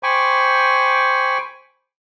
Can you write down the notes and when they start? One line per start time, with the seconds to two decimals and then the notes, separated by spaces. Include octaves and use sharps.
0.03 C5 G5 G#5 B5 C#6 D6